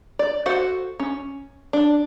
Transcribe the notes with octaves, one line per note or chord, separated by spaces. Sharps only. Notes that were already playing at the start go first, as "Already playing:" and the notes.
D5
F#4 A4 C5 F#5
C#4
D4